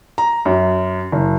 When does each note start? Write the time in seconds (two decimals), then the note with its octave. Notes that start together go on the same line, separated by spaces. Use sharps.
0.18 A#5
0.45 F#2
1.12 F#1